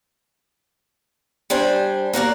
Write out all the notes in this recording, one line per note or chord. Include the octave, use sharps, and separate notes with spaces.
G3 D4 C5 G#5
A#3 F#4 A#4 D5